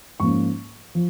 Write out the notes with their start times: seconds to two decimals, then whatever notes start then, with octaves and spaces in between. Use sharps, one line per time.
0.20 G#2 F3 A#3 C#4 C#6
0.95 F3